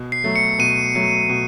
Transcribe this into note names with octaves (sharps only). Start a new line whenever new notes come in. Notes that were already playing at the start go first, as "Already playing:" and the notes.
Already playing: B2
C7
F#3 A3
C#7
B2 D#7
F#3 A3
B2